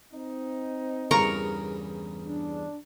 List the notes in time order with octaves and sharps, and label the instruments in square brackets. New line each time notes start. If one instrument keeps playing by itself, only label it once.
[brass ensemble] C4 D#4
[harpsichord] E2 G2 C#3 [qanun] A#4 A#5 C#6
[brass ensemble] D4